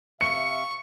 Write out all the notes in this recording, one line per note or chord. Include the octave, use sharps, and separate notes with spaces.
C3 E5 F5 C#6 C#7